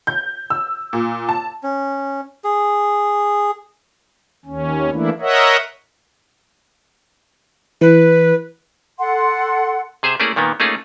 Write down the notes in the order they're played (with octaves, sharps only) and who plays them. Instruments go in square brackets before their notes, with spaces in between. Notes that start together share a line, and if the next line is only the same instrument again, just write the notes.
[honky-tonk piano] G6
E6
A#2
A5
[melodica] C#4
G#4
[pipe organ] D#2 C#4
E3 A3 A#3 D4 E4
A#4 C#5 D#5 E5 F#5
[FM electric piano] E3 [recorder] B4
[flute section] A4 F#5 C6
[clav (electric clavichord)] C3 G#4 C5 E5
A3 A#3 C#4 E4 G#4 D5
A#2 D#3 A#3 B3
A3 A#3 C#4 D#4 F4 G#4